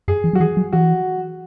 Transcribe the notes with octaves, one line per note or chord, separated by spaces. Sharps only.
F#2 G#4
E3
F#3 F#4
E3 G#4
F#3
E3 F#4